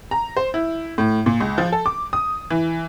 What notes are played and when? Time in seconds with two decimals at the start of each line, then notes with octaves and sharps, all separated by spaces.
0.11 A#5
0.37 C5
0.54 E4
0.98 A2
1.26 A#2
1.40 C#2
1.58 F3
1.72 A4
1.86 D6
2.13 D#6
2.50 E3